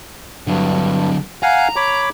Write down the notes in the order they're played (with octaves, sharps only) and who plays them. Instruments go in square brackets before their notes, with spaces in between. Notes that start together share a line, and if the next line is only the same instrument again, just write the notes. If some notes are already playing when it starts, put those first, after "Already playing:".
[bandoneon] G2 [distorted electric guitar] D3 F#3
[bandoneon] F5 F#5 G#5 [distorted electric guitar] A#5
[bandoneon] C#5 B5 D6